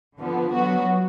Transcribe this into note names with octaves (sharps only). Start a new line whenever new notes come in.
D3 F3 B3
F#3 B3 F#4